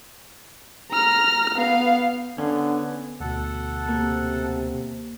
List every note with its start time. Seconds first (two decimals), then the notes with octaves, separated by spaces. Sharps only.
0.91 A#5 F6
1.55 B3 F5
2.38 D3 B3 C#4
3.20 D2 B2 A4 F#5
3.88 C3 A#3